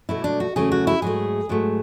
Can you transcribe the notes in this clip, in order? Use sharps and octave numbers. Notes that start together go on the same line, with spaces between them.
B2 F#3 A3 E4
D4
F#4
E2 C#3 F#3 A3 G#4
F#4
E4
G#2 F#3 A3 G#4
G#2 F#3 A3